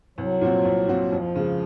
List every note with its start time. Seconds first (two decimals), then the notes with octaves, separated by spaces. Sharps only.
0.18 C2 F#3
0.41 A#2 F3 C4 F#4
0.65 C2
0.88 A#2 F3 C4 F#4
1.12 F2 F3
1.36 C#3 G#3